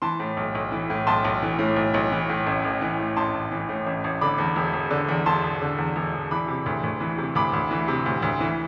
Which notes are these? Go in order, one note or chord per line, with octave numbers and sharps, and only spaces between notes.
E3 A5 C6
A2
B1
B1
E3
A2
B1 A5 C6
B1
E3
A2
B1
B1
E3
A2
A1
A1
E3
A2
A1 A5 C6
A1
E3
A2
A1
A1
D3 B5 D6
E2
E1
E1
D3
E2
E1 A5 C6
E1
D3
E2
E1
E1
E3 B5 D6
C3
D2
D2
E3
C3
D2 B5 D6
D2
E3
C3
D2
D2
E3